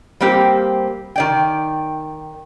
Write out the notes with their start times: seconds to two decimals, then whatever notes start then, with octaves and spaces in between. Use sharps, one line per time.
0.20 G3 A#3 C4 G4
1.16 D#3 D5 G5